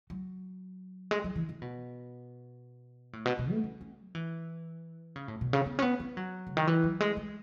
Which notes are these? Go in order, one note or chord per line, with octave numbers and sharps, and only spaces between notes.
F#3
G#3
F#3
E3
E3
B2
A2
B2
B2
A3
C#4
C#4
F#3
E3
C#3
A2
B2
C#3
B3
C#4
B3
B3
F#3
C#3
D#3
E3
F#3
G#3
G#3